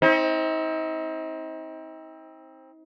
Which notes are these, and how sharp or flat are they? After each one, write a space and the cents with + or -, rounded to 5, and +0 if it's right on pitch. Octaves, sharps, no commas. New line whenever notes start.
C4 +20 D#4 +40